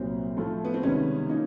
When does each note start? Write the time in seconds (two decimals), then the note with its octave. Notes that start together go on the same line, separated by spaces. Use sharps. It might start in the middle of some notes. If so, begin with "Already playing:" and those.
Already playing: C2 A#2 F#3 C4
0.37 A2 F3 A3
0.65 B3
0.74 C4
0.83 C#2 C3 D#3 G3 B3 C#4
1.29 F3 A#3 C#4 D#4